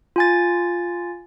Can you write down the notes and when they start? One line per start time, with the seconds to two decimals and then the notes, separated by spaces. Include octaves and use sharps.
0.16 F4 G#5 A6